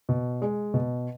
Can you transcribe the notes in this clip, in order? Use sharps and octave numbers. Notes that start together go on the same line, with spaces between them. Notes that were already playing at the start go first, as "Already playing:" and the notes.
B2
G#3
B2